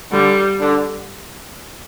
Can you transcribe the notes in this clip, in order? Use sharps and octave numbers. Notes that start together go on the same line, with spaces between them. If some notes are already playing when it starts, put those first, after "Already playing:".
D3 G3
D3